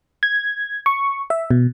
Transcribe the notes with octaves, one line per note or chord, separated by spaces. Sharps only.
G#6
C#6
E5
B2